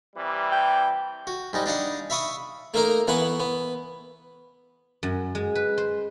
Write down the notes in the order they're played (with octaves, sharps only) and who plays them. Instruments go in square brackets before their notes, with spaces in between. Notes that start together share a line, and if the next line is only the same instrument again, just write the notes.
[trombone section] C3 E3 G3
[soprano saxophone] G5
[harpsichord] F#4
G#2 G3 D#4
D4 D#4 F5 F#5
E5 F5 B5 C#6 D#6
A3 A#3 D#4 A#4
E3 B3 B4 F#5 C#6
B3
[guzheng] F#2
G#3
B4
C5